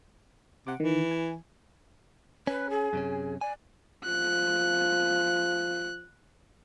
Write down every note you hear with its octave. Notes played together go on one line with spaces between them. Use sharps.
C3 F#5 D6
D#3 E3
G#5
C#4 B4
G#4
F#2 C3 C#4
D5 G#5
F3 F#6